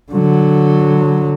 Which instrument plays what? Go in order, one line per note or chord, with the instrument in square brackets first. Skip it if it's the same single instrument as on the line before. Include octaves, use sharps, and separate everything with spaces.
[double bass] D3 F#3